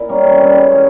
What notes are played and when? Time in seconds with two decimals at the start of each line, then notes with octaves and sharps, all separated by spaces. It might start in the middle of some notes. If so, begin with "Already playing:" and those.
Already playing: A#2 E4
0.09 G3 A#3 C#4
0.24 G2
0.39 G3 C4
0.54 C#3
0.68 E3 G#3 C#4